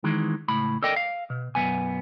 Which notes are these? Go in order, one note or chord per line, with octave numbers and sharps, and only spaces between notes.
D#3 E3 G#3
C#2 A2 B5
A4 A#4 D5 D#5 G5
F5
B2
B1 F#2 D#3 B3 G#5